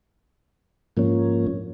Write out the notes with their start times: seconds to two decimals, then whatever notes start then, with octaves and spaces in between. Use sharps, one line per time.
0.97 G#2 F3 A#3 C#4